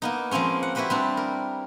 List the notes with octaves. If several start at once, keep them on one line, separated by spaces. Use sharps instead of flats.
A#3 B3 D#4
F3 G#3 A#3 C4 C#4
F#5
E4 F#4 G4 B4 C5 F#5
G3 C4 D4
A#4